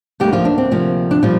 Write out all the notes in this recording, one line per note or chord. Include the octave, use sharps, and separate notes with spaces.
D2 D3 G3 A#3 G4
F3 F4
D4
C4
D2 C3 F3 A#3
D4
A#2 F3 G3 F4